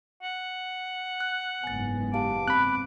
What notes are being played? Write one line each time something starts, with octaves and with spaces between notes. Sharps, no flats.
F#5
F#6
F#1 G#2 B3 G#5 A6
G4 F5 A5 D6
C4 B5 F#6